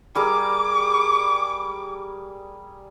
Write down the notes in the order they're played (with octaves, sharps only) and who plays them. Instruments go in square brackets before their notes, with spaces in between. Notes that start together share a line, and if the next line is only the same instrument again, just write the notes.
[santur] G3 G#4 A#4 [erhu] D6